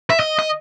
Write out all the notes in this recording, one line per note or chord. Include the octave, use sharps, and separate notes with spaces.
E5
D#5
D#5